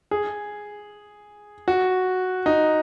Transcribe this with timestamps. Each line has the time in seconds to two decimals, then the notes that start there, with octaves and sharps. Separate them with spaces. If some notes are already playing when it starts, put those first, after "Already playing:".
0.11 G#4
1.68 F#4
2.46 D#4